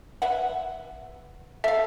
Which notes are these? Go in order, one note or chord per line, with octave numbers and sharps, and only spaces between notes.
B4 E5 F#5
A4 E5 F5